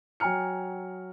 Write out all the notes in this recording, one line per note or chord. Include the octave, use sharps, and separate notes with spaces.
F#3 G5 G#5 A#5 F6 C#7